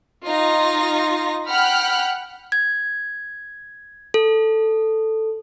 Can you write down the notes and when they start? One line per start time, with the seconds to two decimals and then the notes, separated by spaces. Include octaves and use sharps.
0.25 D#4 F4 A#6
1.47 F#5 G5 B5 F6 F#6
2.52 G#6
4.14 A4